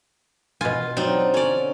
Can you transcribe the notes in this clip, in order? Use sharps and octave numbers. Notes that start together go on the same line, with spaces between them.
B2 F4 G#5
F#3 C4 D4 D#4
D3 C#4 D5